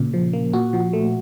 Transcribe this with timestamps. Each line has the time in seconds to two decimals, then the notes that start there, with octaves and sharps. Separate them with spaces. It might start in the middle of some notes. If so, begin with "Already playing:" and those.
Already playing: A#2 C#3
0.14 F3
0.33 A#3
0.53 A#2 F#4
0.73 F3
0.93 A3